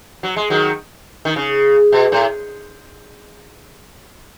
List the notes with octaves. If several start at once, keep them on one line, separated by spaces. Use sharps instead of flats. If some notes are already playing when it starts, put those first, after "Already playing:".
F#3
G#3
D#3 F#3
D#3
C#3
B2
A2